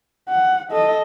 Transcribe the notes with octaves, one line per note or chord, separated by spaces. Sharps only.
F#5
A4 D#5